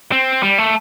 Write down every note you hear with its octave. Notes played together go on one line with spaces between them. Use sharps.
C4
G3
A3